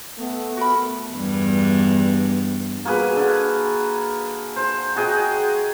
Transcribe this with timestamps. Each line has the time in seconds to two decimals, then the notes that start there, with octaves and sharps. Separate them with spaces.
0.18 A3 B3
0.57 F#4 A#4 B5
1.13 E2 G2
2.85 A#3 F#4 G#4 B4
3.16 D3
4.56 C5
4.96 F#4 G#4 D#5 G5